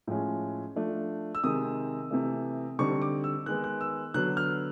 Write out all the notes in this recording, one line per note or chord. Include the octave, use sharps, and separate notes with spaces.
A2 F3 G#3 C#4
F3 A3 D4
E6
C3 D#3 G#3 D#6
C3 E3 A3
D3 G3 C4 D#4 C#6
D6
E6
D#3 G#3 B3 F#6
F#6
E6
D3 F#3 B3 F#6
F6